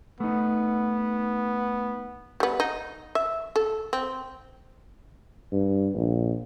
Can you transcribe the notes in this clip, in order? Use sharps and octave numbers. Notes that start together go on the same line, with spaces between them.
A3 B3 D#4
G3 B3
D#4
E5
A4
C4
G2
A#1